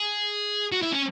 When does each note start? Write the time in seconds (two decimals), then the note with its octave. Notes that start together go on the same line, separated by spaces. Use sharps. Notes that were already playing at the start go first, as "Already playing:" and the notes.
Already playing: G#4
0.72 F#4
0.82 E4
0.92 C#4